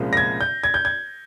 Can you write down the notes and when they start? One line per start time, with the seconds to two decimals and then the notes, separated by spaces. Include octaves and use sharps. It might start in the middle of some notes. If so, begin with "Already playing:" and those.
Already playing: C2 A#2 F3 G#3 C#4
0.13 A#6
0.17 G#6
0.41 G6
0.64 G#6
0.74 G6
0.85 G#6